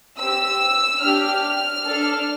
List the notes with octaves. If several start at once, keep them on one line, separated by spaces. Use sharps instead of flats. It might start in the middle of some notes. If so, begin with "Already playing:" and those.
C4 G4 E6
D4 G4 F6
F6
D4 A4